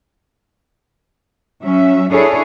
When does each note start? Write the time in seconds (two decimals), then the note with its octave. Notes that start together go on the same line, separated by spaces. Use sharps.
1.63 F#3 C#4 E5
2.10 D4 E4 G#4 A4 C#5